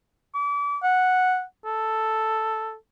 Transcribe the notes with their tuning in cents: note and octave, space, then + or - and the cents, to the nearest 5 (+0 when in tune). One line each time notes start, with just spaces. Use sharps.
D6 -35
F#5 -5
A4 +0